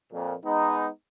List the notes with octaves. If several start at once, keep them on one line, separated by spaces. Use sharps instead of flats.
F2 A#2
G#3 B3 D#4